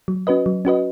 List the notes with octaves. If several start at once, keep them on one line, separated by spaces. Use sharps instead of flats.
F#3
C#4 F#4 B4 D#5
F#3
C#4 F#4 B4 D#5